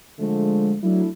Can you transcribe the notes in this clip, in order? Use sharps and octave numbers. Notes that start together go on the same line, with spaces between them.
D3 F3 G#3 A3
F#3 A3 D4 E4